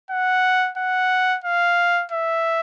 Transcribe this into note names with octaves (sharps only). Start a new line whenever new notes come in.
F#5
F#5
F5
E5